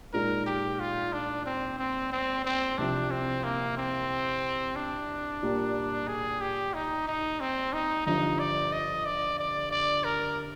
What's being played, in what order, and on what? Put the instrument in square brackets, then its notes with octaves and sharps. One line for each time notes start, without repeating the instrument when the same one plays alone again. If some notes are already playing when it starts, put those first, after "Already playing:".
[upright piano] A#2 G#3 D#4 G#4 [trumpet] A#4
[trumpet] G4
F4
D4
C4
C4
C4
C4
[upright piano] C2 C3 F3 [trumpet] D4
[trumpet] C4
A#3
C4
D4
[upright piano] A#2 G3 A#3
[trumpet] G#4
G4
D#4
D#4
C4
D#4
[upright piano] G1 G2 F3 [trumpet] D#4
[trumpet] D5
D#5
D5
D5
D5
A#4